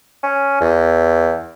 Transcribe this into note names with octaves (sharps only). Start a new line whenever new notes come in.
C#4
E2